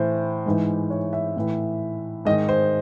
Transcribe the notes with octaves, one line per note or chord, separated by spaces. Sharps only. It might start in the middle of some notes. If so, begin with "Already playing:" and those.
Already playing: A2 E3 C5
G#2 E3
C#5
E5
A2 E3
G#2 D#3 D#5
C5